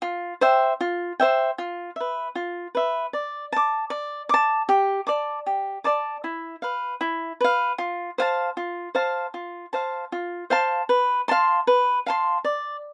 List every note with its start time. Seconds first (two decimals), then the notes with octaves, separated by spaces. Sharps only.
0.02 F4
0.41 C5 E5 G5
0.81 F4
1.20 C5 E5 G5
1.58 F4
1.96 B4 E5
2.35 F4
2.75 B4 E5
3.13 D5
3.52 A5 D6
3.90 D5
4.29 A5 D6
4.69 G4
5.07 D5 A5 D6
5.46 G4
5.84 D5 A5 D6
6.24 E4
6.62 B4 F5
7.01 E4
7.41 B4 F5
7.78 F4
8.18 C5 F5 A5
8.57 F4
8.95 C5 F5 A5
9.34 F4
9.73 C5 F5 A5
10.12 F4
10.50 C5 F5 A5
10.89 B4
11.28 F5 A5 C6
11.67 B4
12.06 F5 A5 C6
12.45 D5